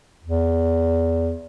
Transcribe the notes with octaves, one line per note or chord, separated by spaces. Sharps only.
E2